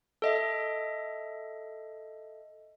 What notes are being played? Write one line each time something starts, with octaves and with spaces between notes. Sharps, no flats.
A4 D#5 E5